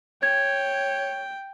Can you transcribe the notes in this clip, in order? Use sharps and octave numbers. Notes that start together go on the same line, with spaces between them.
C#5 G5 G#6